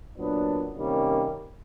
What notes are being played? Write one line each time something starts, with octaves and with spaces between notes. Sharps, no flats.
A#2 F#3 B3 D4
C3 D#3 G3 A#3 C#4